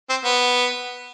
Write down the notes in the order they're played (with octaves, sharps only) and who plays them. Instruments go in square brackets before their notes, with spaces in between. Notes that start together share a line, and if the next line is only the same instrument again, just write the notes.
[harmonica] C4
B3